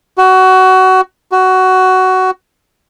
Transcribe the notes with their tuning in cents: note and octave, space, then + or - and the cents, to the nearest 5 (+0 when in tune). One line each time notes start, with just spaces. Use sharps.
F#4 +20
F#4 +15